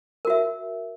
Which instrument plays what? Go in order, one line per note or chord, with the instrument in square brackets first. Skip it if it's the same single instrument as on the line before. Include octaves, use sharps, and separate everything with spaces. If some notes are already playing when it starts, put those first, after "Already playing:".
[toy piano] A#4
F#4
E5